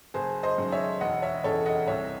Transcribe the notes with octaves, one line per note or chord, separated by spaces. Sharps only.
F#1 G#4 C5
C5 D#5
F#2 D#3 G#3
C#5 E5
E1 D#5 F#5
C#5 E5
E2 C#3 A4 C#5
D#5 F#5
C2 C#5 E5